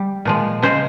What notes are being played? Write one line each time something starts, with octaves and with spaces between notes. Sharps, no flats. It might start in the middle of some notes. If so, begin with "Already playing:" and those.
Already playing: G3
A#2 F3 G#3
C#3 G#3 C5